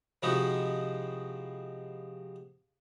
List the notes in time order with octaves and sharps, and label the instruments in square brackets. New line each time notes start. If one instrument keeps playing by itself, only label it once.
[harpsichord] C3 F3 G#3 D#4 E4 F#4